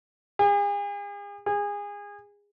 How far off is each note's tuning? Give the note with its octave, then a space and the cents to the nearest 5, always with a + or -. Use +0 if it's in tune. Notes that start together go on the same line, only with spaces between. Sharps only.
G#4 -40
G#4 -25